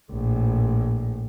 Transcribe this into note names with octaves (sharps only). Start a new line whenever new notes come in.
A#1 A2